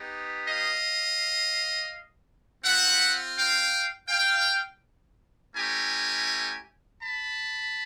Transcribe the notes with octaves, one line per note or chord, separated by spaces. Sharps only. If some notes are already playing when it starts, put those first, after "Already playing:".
Already playing: B3 D#4 G4
D#5 F5
C4 F4 E5 F#5
F5 G5
F5 G5
A3 C#4 E4 G4 G#5 A#5
A5 B5